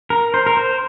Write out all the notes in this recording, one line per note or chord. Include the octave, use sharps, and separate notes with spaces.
A#4
C5
A#4
C5